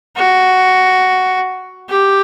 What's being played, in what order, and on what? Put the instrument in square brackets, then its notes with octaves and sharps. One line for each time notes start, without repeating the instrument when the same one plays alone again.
[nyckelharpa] F#4
G4